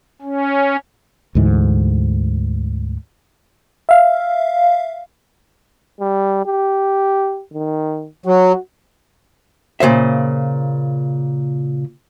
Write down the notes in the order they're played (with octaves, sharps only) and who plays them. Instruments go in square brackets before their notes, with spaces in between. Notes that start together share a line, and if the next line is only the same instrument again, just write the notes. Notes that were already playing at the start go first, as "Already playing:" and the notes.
[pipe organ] C#4
[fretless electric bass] D2 G#2 E3
[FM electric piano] E5 F5
[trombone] G3
G4
D#3
[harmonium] F#3 [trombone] F#4
[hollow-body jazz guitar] A#2 C#3 C5 E5